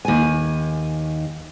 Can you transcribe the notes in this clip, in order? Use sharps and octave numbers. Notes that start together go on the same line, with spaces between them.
D#2 G#5